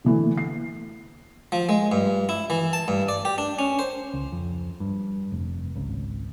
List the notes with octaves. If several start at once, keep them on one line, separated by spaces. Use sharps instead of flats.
D3 E3 A3
C7
F3
G#3
G2
E4
E3
A5
G2
D5
G4
D4
C#4
C5
C#2
F2
G2
F1
G#1 C#2